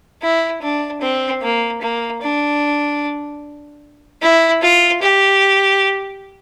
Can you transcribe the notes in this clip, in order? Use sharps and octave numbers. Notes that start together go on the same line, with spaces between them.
E4
D4
C4
A#3
A#3
D4
E4
F4
G4